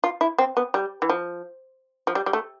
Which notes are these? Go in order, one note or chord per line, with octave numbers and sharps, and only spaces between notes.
F4
E4
C4
B3
G3
E3
F3
F3
G3
G3
A3